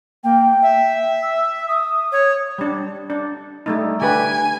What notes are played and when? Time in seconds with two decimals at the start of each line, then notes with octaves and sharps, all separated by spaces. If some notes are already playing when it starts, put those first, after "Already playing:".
0.24 A#3 G5
0.62 E5
1.22 E6
1.68 D#6
2.12 C#5
2.58 G3 D4
3.10 D4
3.66 G3 A3 D#4
4.01 D3 G4 B4 G#5